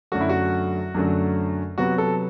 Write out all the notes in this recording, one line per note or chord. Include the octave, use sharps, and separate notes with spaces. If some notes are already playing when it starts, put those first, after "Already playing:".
F#2 D3 F#3 A3 F#4
E4
F#4
F#2 D3 F#3 A3
C3 F#3 B3 F#4
A4